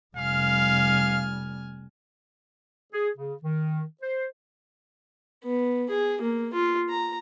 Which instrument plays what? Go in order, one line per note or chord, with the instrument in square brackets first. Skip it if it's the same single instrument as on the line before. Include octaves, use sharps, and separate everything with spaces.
[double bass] F1 G3 [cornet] F5 [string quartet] G#5 F6
[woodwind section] G#4
C#3
D#3
C5
[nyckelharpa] B3
G#4
A#3
F4
A#5